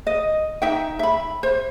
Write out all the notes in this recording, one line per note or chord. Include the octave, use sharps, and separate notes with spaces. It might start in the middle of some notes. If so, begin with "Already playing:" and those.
D#5
D#4 E5 G5
E5 B5
C5